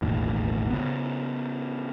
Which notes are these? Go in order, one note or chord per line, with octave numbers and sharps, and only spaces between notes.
E1 A1 D#2 A2
C#3 B3